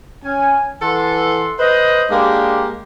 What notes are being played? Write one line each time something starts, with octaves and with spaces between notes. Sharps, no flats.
C#4 G#5
E3 A4 F#5 C6
B4 C5 D#5
G#3 A#3 D4 G4